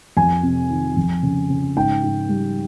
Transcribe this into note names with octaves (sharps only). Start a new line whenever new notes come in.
F2 G#5
C3
D#3
F2
C#3
C#3
G#2 G5
G#2
G3